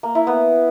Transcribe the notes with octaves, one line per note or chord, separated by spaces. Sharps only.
A#3
E4
B3